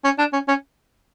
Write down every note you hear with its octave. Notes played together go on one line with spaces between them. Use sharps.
C#4
D4
C#4
C#4